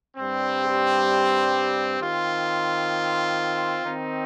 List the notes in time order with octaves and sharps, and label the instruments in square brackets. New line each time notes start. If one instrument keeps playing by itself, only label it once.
[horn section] G2 G3 C4
G4
D#3 C4 F4
D#3 C4 D#4